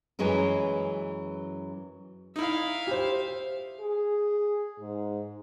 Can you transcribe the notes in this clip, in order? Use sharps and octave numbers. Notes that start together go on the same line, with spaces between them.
F#2 E3 F#3 G#3 C#4
D#4 E4 E5 F5
G4 C5
G#4
G#2